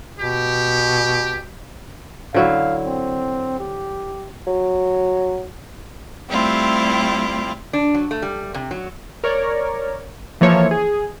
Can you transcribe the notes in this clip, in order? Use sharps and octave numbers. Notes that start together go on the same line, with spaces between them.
B2 G4
D3 F#3 E4 F5
C4
G4
F#3
G3 A3 C4 E4 F4 G4
D4
F#3
A3
G3
C3
F#3
A#4 C#5 D5
E3 F3 A#3 A4 C#5 E5
G#4